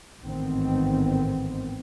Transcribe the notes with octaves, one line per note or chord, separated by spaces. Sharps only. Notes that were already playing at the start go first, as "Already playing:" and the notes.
A1 G#2 D#3 B3 C4